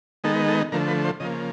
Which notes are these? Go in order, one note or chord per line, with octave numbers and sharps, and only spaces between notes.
D#3 G#3 B3 D#4 A4
A4
D3 F3 A3 A#4
B4
C5
C#3 F3 A#3 D#5